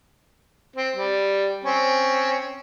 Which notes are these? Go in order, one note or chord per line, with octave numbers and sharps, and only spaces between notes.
C4
G3
C4 C#4